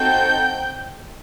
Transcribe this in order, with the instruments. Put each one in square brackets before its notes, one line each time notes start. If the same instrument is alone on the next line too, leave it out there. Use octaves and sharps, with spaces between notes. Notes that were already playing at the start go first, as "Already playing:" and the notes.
Already playing: [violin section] C4 D#4 F#4 A4 G5 G6